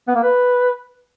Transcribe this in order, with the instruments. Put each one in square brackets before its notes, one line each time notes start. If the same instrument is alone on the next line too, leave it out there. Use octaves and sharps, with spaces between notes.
[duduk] B3
A#3
B4